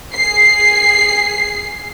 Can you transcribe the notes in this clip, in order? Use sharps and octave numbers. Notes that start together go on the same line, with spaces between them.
G#4 C7